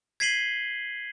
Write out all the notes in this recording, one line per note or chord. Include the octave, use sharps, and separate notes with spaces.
G#6 B6 C7 D#7 F#7 G7